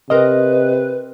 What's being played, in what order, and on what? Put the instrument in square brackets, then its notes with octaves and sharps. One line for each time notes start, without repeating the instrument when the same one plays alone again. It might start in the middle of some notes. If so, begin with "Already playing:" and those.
[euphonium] C3 [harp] C4 A#4 [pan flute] B4 [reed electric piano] D#5